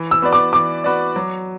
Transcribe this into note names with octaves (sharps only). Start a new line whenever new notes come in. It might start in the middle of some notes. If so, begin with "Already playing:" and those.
Already playing: E3
E6
B3 F#4 B4 D5
D6
E3 D6
B3 F#4 B4 D5
F#3